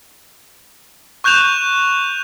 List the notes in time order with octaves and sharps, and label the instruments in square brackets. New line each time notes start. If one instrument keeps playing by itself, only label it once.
[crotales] C#6 F#6 G6 E7 F7